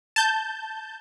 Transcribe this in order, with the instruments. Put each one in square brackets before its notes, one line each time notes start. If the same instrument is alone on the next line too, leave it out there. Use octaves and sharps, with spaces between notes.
[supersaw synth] A5 G6